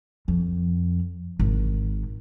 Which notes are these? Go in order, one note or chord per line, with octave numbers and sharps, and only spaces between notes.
F2
G#1